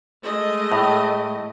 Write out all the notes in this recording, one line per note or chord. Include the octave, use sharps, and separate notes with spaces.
G#3 A3 D#5
A2